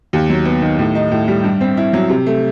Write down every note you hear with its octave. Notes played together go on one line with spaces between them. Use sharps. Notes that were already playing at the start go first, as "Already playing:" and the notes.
D#2
F#3
B3
D#3
A2
D#4
A2
G3
G2
C4
E4
F#3
C3
A3